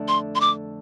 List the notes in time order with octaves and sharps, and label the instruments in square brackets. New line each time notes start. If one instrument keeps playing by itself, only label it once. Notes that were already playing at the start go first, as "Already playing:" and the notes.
Already playing: [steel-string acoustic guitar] F2 D3 A3 D4
[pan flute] C6
C6
D6